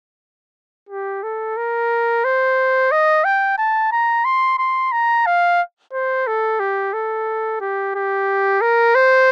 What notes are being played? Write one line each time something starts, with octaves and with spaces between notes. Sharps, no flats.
G4
A4
A#4
C5
D#5
G5
A5
A#5
C6
C6
A#5
F5
C5
A4
G4
A4
G4
G4
A#4
C5